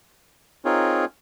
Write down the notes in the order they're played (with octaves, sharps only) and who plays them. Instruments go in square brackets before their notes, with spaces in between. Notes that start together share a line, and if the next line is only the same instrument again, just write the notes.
[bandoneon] C4 D#4 F4 G#4 A#4 C#5